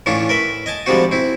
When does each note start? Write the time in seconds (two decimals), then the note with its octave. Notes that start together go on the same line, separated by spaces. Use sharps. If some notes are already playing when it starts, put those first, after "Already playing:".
0.06 A2 E3 C#4 D4 F4
0.29 A#4 B4 E5
0.66 D#5 G#5 A5
0.86 D3 F3 G3 G#3 C4 F#4
1.11 C4 E4